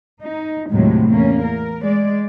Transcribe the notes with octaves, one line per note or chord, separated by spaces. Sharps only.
D#4
D#2 A2 C3 D#3 F#3 G#3
E2 A3 A#3 C#4
A#4
G#3 D5